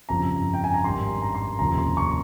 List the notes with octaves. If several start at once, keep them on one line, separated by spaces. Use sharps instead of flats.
G1 F2 C#3 F3 A#5
G5
G#5
A#5
G#1 G2 D#3 C6
A#5
C6
F1 D#2 C#3 F3 A#5
C6
C#6